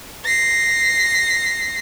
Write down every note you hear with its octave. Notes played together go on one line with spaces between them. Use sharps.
A#6 C7